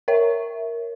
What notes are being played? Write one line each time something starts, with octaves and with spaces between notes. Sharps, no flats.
A#4 C#5 E5